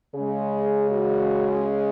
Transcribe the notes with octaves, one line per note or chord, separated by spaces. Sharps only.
C#3 G#3 G#4
F#4